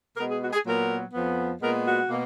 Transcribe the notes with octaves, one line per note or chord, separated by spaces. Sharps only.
B2 G#3 B3 A#4
G#4
F#4
G#4
A#2 F#3 B3 A#4
F2 F3 B3
A#2 G#3 B3 A#4
F#4
B2 A#3